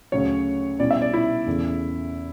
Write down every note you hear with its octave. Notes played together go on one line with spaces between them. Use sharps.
D2 C#3 F#3 C#5
B2 G3 C#4 E4 D5
E5
D5
E4
E2 C#3 E3 A3